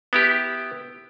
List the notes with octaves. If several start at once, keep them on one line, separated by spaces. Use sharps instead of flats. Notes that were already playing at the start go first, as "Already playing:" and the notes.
B3 E4 G4